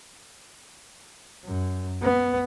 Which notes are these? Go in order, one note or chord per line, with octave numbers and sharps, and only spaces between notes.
F#2
B3